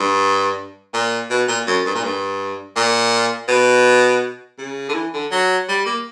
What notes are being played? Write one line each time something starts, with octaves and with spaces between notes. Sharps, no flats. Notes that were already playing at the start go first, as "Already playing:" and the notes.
Already playing: G2
A#2
B2
A#2
F#2
G2
A#2
G2
A#2
B2
C#3
D3
E3
D3
F#3
G3
A#3